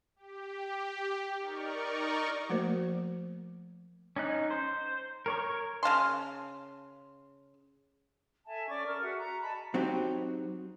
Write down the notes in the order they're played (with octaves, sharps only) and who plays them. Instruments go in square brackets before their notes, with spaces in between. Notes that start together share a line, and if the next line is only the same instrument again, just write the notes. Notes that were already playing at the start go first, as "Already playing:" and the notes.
[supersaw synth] G4
D#4 A#4 D5 C#6
[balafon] F3 A3 A#3 F#4 A#4 C5
[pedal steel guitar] C#4 D#4 F#6
C5
A#4 C#5 C#6
[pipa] C#3 F5 A5 C6
[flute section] A4 E5 G#5 A5
C#4 D5 C#6 D6
A4 A#4 C#6
F#4 G#4 E5 F#5
A#5
D#5 G#5 A5 B5
[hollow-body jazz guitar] F#3 C4 D#4 F#4 G4